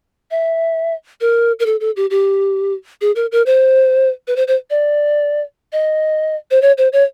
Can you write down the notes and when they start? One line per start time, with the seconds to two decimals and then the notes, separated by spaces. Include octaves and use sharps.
0.31 E5
1.21 A#4
1.60 A#4
1.66 A4
1.80 A4
1.96 G4
2.10 G4
3.01 G#4
3.16 A#4
3.32 A#4
3.46 C5
4.27 B4
4.36 C5
4.48 C5
4.70 D5
5.73 D#5
6.51 C5
6.62 C#5
6.78 C5
6.93 C#5